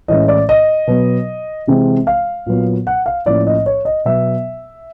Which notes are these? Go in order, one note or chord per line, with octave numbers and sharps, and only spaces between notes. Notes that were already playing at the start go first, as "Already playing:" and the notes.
A2 E3 G#3 C#4 D#5
D5
D#5
B2 F#3 B3
C3 E3 G#3 C4
F5
A#2 F#3 B3
F#5
F5
A2 F3 A#3 C#4 D5
D#5
C#5
D#5
B2 F#3 B3 E5